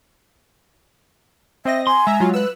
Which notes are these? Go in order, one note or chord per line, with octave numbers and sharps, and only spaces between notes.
C4 D#5 E5 A#6
G#5 C6
G#3 E5 A#5
F#3 F4
B4 E6 F#6